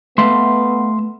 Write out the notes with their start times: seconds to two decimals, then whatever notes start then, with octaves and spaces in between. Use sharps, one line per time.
0.18 A3 B3 E5 F5 C6